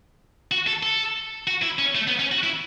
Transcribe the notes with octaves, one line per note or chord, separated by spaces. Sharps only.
F#4
A4
A4
F#4
E4
C#4
A3
B3
C#4
F#4
E4